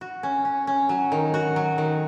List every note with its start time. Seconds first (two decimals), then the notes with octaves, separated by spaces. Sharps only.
0.01 F#4
0.23 C#4
0.45 C#4
0.67 C#4
0.89 F#3
1.12 D#3
1.34 F#4
1.56 F#3
1.78 D#3